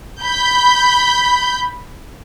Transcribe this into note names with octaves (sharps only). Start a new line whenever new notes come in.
B5 G6